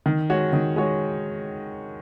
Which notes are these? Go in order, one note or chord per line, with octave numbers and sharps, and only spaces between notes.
D#3
G#3 F#4 C#5
D#3
G#3 F#4 C#5